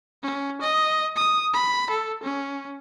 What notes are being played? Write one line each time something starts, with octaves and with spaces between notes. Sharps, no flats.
C#4
D#5
D#6
B5
A4
C#4